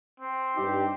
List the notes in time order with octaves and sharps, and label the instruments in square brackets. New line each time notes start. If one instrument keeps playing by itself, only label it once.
[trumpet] C4
[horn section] G2 D#4 G4